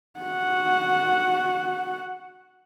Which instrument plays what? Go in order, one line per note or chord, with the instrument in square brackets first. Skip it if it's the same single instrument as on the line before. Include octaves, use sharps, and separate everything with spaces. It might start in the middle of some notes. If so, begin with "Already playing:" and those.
[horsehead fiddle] F#4 F#5